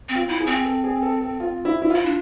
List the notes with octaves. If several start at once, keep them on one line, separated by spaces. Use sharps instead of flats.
C4
F4
E4
G#4
C4
A4
G#4
A4
A4
F4
E4
E4
F4
E4
D4